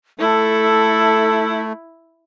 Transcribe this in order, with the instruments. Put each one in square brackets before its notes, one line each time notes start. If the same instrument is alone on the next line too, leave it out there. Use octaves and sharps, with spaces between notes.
[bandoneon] A3 [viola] E4 [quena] A4